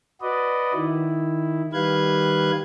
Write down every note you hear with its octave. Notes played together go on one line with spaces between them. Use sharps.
F#4 B4 D5 D#5
D#3 E4
D#3 G3 B4 F5 F#6 G#6